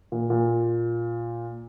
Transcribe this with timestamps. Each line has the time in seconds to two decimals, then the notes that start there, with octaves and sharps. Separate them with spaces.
0.12 A#2
0.30 A#2